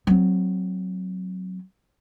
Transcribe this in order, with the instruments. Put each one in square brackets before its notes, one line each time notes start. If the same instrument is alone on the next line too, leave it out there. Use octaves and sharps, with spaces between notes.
[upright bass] F#3 C4